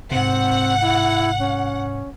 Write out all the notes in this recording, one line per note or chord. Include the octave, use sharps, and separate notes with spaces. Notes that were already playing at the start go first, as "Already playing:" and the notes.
G#2 C3 C4 F#5
E4
C#4